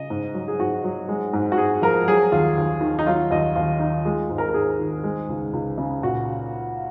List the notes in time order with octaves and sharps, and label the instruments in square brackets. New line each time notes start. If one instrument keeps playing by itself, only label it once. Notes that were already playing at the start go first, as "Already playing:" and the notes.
Already playing: [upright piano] C#3 D#5
G#2
F#3
G#4
G#2 F#4
F#3
G#3
G#2
F#4
G#2 G#4
F3 A#4
F#3 G#4
D#2 F4
D#2
D#3
D#4
F#3 F4
D#2 D#5
D#2 F4
D#3 D#4
G#3 F4
G#2
A#4
A#4
G#2 G#4
D#3
G#3
C#2
C#2
C#3
A#2 F#4